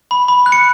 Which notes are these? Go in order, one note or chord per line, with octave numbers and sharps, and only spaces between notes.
B5
B5
F#6
C#7